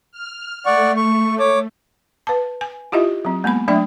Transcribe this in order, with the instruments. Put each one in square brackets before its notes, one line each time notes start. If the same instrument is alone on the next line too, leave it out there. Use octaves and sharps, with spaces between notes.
[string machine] F6
[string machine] A3 [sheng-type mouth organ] D5 F#5 C#6
[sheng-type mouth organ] C#6
C#5 D6
[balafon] B4 A5
G#5
E4 F4 G4 D#5 E5
F#3 C4
G#3 A#3 B3 B5
F#3 A3 D4 D5 E5 G5